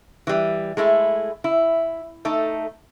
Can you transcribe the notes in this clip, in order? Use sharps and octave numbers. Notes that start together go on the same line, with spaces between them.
E3 G3
G#3 A3 E4
E4
A3 D#4 A4